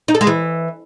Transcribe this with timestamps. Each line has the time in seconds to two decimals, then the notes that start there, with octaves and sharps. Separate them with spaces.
0.08 D#4
0.15 A4
0.21 G#3
0.27 E3